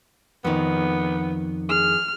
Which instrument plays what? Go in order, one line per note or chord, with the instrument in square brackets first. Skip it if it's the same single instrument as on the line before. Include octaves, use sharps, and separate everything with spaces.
[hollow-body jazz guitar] F2 D#3 [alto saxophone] B3
[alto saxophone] G#4 [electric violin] F6